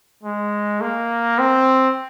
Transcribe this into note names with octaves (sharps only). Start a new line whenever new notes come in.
G#3
A#3
C4